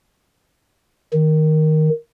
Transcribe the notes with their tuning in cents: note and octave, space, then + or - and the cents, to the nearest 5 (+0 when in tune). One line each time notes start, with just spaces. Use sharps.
D#3 +0